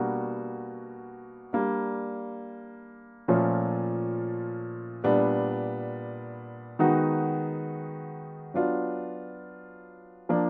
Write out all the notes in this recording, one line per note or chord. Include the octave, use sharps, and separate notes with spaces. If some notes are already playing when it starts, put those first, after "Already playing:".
Already playing: B2 G3 A#3 D4 F#4
G3 A#3 D4
A#2 F3 A3 C#4 F4
A#2 G3 B3 D4
D#3 G#3 B3 D#4 F#4
F#3 B3 D4 F4
F3 A#3 D4